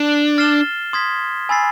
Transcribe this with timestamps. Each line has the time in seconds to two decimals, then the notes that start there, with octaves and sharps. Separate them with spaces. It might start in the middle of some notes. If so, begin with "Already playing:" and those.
Already playing: D4
0.38 F6 A6 C7 E7 G7
0.93 C6 D#6 G#6 B6
1.49 G#5 B5 E6 A6 C7